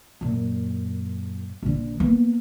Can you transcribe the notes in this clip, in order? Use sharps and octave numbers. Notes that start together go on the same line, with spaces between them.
F#2 A#2
A#1 D3
A#3 B3